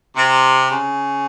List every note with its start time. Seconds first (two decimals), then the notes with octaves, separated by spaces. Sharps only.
0.16 C3
0.71 C#3